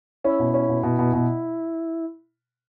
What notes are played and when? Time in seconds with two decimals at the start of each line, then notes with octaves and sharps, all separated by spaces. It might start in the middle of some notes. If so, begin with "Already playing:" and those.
0.24 C#4 E4
0.39 B2
0.54 C#4
0.69 B2
0.83 B2
0.99 B2
1.13 B2